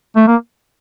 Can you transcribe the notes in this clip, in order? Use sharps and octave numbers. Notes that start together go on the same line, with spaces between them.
A3
A#3